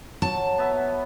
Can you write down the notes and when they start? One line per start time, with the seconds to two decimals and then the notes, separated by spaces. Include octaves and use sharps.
0.22 F#3 A5
0.58 B3 E5